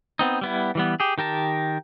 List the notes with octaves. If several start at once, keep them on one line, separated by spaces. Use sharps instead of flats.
B3 C4 D#4
G3 B3 E4
E3 G3 B3
G4 G#4
D#3 G4 A#4 A5